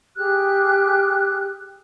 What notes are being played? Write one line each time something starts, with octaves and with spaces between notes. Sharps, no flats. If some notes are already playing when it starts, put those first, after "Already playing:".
G4 G#4 F6 F#6